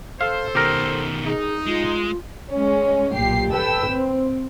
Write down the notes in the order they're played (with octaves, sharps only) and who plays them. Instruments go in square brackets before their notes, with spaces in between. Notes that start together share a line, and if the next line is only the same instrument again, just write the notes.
[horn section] A4 C5 [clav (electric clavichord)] F5
[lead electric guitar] B2 D#3 [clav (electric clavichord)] G4 A#4
[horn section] D#4 [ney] G#4
[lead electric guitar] G#3 [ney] F4
[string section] G#3 C#4
B1 A#2 G4 C7
A4 B4 G5 E6
C4